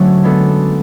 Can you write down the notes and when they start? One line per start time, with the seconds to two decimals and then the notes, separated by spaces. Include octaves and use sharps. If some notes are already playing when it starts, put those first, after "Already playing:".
Already playing: D3 F#3 A3 C#4 F#4
0.24 G#3 B3 D4 A4